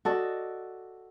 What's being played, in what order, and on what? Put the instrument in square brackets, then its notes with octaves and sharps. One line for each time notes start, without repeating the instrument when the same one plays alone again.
[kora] F#4 A4 D5 D#5